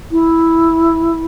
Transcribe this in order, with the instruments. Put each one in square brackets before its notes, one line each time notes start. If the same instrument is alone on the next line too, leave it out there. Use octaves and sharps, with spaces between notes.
[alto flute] E4